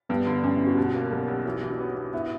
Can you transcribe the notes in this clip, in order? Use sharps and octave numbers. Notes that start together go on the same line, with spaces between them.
G2 B3
D3
G2 C#4
E4
G1
F#4
B2 G4
A#3
B1 A#4
B1 G4
E3 F#4
G4
E3 F#4
D4
B3
B3
B3 E4